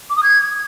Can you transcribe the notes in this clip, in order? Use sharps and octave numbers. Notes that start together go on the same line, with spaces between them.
D6
D#6
G#6